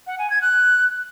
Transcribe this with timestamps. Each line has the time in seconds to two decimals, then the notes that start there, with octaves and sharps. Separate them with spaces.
0.07 F#5
0.18 G#5
0.30 G#6
0.42 F#6